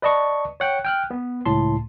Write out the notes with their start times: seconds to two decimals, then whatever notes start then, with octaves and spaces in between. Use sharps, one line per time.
0.02 B4 D5 D#5 A5 C#6
0.60 C#5 F#5 G5
0.84 G5 F6 F#6
1.11 B3
1.46 C#2 A2 A5 C6